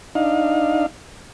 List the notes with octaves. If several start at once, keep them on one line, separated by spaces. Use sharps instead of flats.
D4 D#4 F5